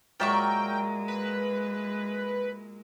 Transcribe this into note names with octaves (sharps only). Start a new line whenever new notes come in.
A#2 F#3 G#3 A#4 D5 E5 G5 C#6
B4